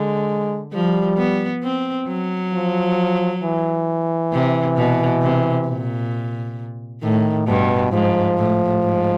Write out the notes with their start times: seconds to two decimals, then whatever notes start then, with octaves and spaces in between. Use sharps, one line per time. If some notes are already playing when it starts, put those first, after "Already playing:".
Already playing: D3 G#3
0.73 F3 G3
1.18 B3
1.63 C4
2.08 F#3
2.53 F3
3.42 E3
4.32 C3
4.77 B2
5.22 C3
5.68 A#2
7.02 A2 D#3
7.47 G2 B2
7.92 G#2 F3
8.38 A2
8.82 G#2